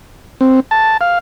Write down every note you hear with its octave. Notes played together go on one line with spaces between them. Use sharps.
C4
A5
F5